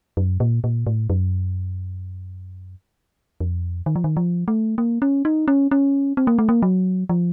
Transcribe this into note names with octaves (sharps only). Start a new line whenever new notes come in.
F#2
A#2
A#2
A2
F#2
F2
D#3
F3
D#3
F3
A3
A#3
C#4
D#4
C#4
C#4
C4
A#3
A3
A#3
F#3
F3